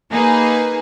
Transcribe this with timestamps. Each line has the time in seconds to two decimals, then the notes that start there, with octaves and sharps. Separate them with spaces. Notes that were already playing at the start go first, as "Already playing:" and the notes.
0.11 A#3 D#4 G#4 B4